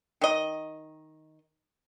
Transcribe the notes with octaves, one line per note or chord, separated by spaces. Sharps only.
D#3 D#5